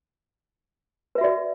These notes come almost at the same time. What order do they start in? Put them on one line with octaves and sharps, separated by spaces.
B4 E5 F#4 D5